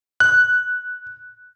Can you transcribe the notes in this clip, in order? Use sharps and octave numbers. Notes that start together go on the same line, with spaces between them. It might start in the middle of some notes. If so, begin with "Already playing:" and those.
F#6